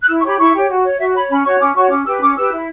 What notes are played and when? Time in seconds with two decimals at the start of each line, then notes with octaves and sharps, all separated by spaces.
0.02 F#6
0.07 E4 E6
0.19 C#6
0.24 G4 C#5 B5
0.38 E4 C#6
0.54 G4 C#5
0.68 F#4
0.84 C#5
0.98 F#4 E5
1.15 C#5 B5
1.29 C#4 B5
1.44 F#4 C#5 C#6
1.59 C#4 D6
1.75 F#4 C#5 C#6
1.90 C#4 D6
2.05 G4 B4 E6
2.21 C#4 D6
2.36 G4 B4 E6
2.51 E4